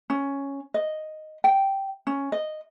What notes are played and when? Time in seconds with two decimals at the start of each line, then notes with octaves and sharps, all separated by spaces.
0.10 C#4
0.74 D#5
1.44 G5
2.07 C#4
2.32 D#5